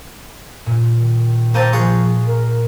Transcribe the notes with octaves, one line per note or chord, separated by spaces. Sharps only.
A#2
D#3
A#3 C4 A5 A#5 G6 D#7
F3 F4 G#4 C#6 F#6
A#4